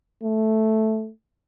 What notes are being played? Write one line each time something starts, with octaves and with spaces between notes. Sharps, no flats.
A3